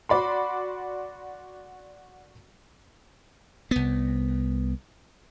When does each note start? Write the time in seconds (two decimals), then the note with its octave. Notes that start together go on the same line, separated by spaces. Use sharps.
0.09 F#4 D5 B5 C6
3.71 C2 B3